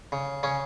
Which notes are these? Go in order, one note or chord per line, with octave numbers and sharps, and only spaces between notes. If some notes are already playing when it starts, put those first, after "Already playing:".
C#3
C#3 C#4